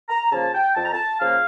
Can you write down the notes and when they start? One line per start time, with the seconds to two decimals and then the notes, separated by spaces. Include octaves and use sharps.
0.09 A#5
0.31 C#3 F3 A#3 A5
0.54 G5
0.75 F2 A5
0.85 A#5
0.93 A5
1.20 C#3 F3 A#3 F5